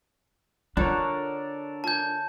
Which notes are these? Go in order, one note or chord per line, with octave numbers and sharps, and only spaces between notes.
D3 D4 F4 A4 A#4 C#5 F#5
F4 G#5 A5 G6